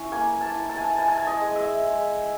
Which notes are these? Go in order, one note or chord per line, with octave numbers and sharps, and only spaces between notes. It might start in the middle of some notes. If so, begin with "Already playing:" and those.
Already playing: C#4 E4
A#3 G#5
A5
E4
A5
G#5
A5
E4 G#5
A5
G#5
D#5
G#3
E5
G#3